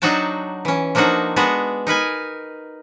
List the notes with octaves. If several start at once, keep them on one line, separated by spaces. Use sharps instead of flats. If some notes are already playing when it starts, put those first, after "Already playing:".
F#3 D4 D#4 F#4 G5 A5
E3 C#4
F3 A#3 D4 D#4 F#4
G#3 B3 D4 F#4
D#4 A#4 B4 G#5